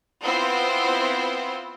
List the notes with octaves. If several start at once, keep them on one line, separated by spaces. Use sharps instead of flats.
B3 C4 E4 F4 C5